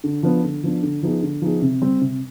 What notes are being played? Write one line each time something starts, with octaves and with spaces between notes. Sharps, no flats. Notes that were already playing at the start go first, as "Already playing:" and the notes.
D3
F3 B3 D4
D3
F3 B3 D4
D3
F3 B3 D#4 G#4
D3
F3 B3 D#4 G#4
C3
G3 C4
C3